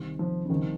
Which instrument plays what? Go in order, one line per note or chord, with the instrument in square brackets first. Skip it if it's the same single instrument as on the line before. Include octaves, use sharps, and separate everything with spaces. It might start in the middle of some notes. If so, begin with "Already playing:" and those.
Already playing: [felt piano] C2 C3 D#3
[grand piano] F3
C#3
[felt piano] C2 C3 F3 [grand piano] D#3